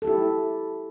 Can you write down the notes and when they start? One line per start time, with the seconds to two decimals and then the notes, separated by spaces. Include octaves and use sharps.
0.02 A4
0.05 G4
0.07 E4